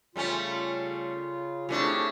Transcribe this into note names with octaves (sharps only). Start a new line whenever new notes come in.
C#3 G3 A3 C#4 F4
C#3 A3 C4 D4 E4 G4